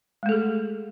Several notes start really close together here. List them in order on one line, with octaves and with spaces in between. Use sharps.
G#3 A3 A4 G#4